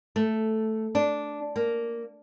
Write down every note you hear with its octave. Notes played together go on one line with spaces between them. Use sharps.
A3
D4
A#3